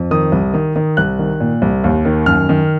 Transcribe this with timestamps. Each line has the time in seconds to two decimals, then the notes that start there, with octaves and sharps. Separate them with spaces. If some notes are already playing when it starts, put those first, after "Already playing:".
Already playing: F2
0.11 D#3 D#6
0.32 C2
0.54 D#3
0.76 D#3
0.97 C2 F#6
1.19 D#3
1.40 A#2
1.62 C2
1.84 D#2
2.05 D#3
2.26 F#2 F6
2.49 D#3